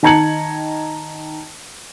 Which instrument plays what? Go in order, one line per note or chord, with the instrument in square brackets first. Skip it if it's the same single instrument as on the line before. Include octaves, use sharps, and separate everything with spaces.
[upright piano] D#3 A5 A#5 G#6 C#7 F#7